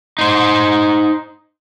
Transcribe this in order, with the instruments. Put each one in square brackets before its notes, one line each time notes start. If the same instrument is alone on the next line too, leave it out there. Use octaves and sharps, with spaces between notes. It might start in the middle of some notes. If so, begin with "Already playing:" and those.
[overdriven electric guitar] D#4 C5